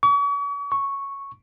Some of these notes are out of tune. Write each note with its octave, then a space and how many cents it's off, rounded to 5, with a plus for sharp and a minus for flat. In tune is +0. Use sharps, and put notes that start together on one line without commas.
C#6 +40
C#6 -5